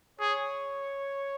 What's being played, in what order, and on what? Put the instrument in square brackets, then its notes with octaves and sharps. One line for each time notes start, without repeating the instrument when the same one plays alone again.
[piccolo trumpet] G#4 [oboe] C#5